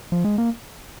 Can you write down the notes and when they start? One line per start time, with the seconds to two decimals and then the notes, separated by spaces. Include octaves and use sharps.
0.12 F3
0.24 G#3
0.38 A#3